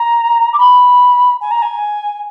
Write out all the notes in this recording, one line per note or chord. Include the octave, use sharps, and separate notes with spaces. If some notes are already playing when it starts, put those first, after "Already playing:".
Already playing: A#5
D6
B5
G#5
A#5
G#5